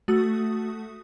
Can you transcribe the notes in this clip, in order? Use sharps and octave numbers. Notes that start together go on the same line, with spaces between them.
A3 F#4 D#6